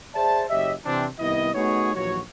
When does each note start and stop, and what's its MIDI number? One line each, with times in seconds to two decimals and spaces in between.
0.15 0.43 68
0.15 0.43 72
0.15 0.43 74
0.15 0.43 76
0.15 0.43 81
0.49 0.73 30
0.49 0.73 67
0.49 0.73 73
0.49 0.73 75
0.49 0.73 76
0.85 1.06 48
0.85 1.06 52
0.85 1.06 60
0.85 1.06 62
1.19 1.50 36
1.19 1.50 51
1.19 1.50 59
1.19 1.50 64
1.19 1.50 75
1.54 1.93 57
1.54 1.93 59
1.54 1.93 63
1.54 1.93 66
1.54 1.93 68
1.54 1.93 73
1.95 2.19 34
1.95 2.19 39
1.95 2.19 52
1.95 2.19 54
1.95 2.19 66
1.95 2.19 73